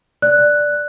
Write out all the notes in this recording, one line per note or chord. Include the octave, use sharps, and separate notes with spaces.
D5 F#6